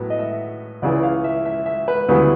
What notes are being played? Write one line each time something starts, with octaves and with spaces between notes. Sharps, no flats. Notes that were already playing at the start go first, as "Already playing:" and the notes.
Already playing: A2 F#3 B3
D#5
E5
C#2 C#3 E3 D5
F5
E5
E5
E5
B4
D2 C#3 E3 G3 B3 B4